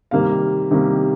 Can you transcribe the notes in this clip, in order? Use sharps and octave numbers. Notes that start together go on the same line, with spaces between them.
C3 D#3 G3 A#3 F5
C3 D#3 G3 A#3